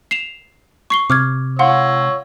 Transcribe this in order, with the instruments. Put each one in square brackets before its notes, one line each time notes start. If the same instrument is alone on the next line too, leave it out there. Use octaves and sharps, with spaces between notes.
[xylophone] C7 E7 F7
C#6 C7 G7
[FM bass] C3 [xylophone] D6 F6 G#6
[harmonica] C#5 E6 [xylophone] F5 F#5 C6